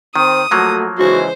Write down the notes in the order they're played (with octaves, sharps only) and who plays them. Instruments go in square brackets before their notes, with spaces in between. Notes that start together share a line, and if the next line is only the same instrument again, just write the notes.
[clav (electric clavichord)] D#3 [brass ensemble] C4 [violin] D#6
[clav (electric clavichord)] F3 F#3 A#3 [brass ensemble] A3 F#4
[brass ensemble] C#3 E3 G#3 [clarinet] F#4 [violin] C5